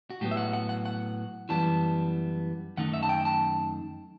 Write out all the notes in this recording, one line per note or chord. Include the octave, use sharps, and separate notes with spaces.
F#4
A2 F#3 B3 G4
E5
F#5
F#5
F#5
F#5
F#2 E3 G3 B3 E4 A5
F#2 D#3 A3 D#4 F#5
E5
A5
G5
A5